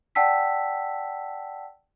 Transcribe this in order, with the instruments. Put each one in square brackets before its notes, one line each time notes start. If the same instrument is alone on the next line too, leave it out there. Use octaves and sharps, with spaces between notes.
[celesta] D5 F#5 G5 A5 E6 B6